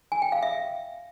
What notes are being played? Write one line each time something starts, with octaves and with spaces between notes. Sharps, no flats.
G#5
G5
F5
E5